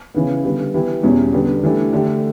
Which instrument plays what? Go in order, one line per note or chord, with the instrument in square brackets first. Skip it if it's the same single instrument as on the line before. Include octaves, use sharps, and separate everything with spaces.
[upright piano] C#3 E3 B3
D3 G3 B3
E3 B3 E4 G4
E2 B2 G3 C#4
D3 G3 B3 D4 G4
E3 A3 D4 G4
D3 A3 D4 G4